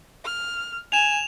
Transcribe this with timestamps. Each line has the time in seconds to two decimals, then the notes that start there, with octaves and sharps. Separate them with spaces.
0.24 F6
0.92 G#5 E7 F7